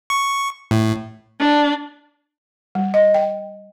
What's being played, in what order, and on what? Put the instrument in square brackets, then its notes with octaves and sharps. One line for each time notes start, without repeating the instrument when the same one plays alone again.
[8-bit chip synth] C#6
A2
[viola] D4
[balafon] G3
D#5
G5